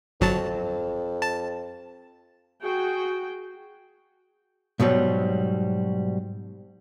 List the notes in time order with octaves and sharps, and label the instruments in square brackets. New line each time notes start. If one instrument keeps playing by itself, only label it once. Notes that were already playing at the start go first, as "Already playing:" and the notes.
[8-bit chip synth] G1 F#3 A5 [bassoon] F2
[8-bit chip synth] A5
[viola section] F#4 G#4 G5
[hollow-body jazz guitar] G#2 B2 F#3 G3